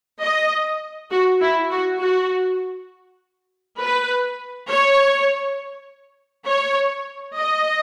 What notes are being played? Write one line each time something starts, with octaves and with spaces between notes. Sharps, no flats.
D#5
F#4
E4
F#4
F#4
B4
C#5
C#5
D#5